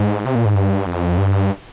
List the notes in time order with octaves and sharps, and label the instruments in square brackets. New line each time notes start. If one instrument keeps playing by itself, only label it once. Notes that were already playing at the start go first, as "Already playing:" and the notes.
Already playing: [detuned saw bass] G#2
C3
A#2
G#2
G2
F2
G2